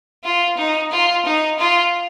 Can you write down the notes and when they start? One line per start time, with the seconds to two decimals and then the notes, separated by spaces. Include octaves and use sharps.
0.24 F4
0.57 D#4
0.91 F4
1.25 D#4
1.59 F4